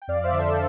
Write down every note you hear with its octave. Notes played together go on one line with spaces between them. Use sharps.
G5
F2 D5 F5
C5 E5
D3
A4 C5